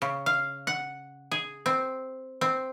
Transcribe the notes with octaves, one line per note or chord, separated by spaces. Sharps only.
C#3
F5
F#5
G#4
C4
C4